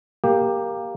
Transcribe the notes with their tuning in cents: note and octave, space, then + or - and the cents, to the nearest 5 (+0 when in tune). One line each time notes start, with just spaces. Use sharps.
A#3 +0 G4 +10